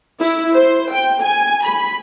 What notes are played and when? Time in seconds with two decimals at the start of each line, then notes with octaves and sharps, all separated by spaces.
0.21 E4
0.53 C5
0.91 G5
1.23 G#5
1.64 B5